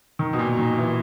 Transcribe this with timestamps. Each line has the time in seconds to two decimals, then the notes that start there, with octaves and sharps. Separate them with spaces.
0.19 D#3
0.33 B2
0.39 A#2
0.59 D#3
0.78 E3